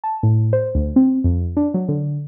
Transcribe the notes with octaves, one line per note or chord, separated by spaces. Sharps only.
A5
A2
C5
D2
C4
F2
D4
F#3
D3